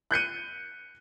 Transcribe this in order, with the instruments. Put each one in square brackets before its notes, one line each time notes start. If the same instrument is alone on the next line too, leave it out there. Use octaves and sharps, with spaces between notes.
[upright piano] F#6 G6 C#7 D#7